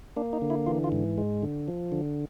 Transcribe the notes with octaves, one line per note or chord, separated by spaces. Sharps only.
A#3 D4
D#4
D3
E4
E3 F4
F4
G#2
G#3
D3
F3
D3